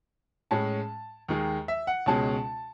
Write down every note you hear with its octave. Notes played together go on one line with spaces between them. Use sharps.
A2 G#3 C#4 A5
D#2 D#3 G#3
E5
F#5
C#2 B2 G#3 C#4 A5